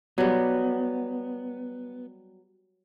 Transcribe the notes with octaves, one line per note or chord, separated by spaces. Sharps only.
F#3 G3 B3